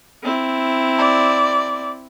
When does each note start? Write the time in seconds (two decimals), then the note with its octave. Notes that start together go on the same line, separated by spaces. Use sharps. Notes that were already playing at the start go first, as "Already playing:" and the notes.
0.23 C4 E4
0.99 D5